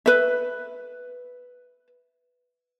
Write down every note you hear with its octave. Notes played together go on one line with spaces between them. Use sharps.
B4 E5